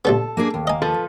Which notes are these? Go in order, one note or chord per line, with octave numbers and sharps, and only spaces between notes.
A#1 G3 B3 A4
A#3 D4 G#4
D#2
A#3 D#5 G#5
F3 A4 B4